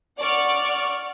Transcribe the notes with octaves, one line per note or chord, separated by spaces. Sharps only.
D5 F#5 C#6 F6